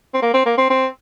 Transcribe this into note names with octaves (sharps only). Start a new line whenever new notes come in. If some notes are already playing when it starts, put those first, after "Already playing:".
C4
A#3
C4
A#3
C4
C4